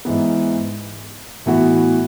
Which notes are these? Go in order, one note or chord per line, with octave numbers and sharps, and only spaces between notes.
G#2 E3 B3
A2 E3 B3 F#4